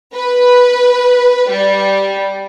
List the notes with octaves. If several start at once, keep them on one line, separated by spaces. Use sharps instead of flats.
B4
G3